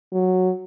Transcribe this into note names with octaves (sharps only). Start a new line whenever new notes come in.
F#3